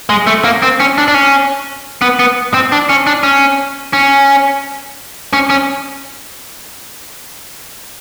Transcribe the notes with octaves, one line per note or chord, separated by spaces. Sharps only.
G#3
A3
A#3
C4
C#4
D4
D4
C#4
B3
B3
C4
D4
C#4
D4
C#4
C#4
C#4
C#4